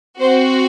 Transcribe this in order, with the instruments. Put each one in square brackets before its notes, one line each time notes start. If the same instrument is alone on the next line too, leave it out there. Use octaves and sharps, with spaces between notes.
[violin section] C4 F#4 C5